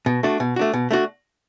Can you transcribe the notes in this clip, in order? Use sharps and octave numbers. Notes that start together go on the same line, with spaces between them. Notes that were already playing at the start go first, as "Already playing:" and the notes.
B2
A3 D4 F#4
B2
A3 D4 F#4
B2
A3 D4 F#4